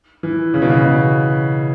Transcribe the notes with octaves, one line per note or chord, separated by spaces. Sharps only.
E3
C#3
B2
C#3
B2